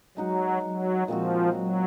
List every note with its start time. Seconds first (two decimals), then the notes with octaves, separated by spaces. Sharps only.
0.17 F#3 G#3 D#4 F#4
0.62 F#3
1.08 A#2 F3 G#3 C4 F#4
1.53 F#3